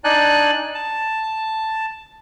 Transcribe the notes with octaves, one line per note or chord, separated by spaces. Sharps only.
D4 D#4 D5 G#5 F#6
A5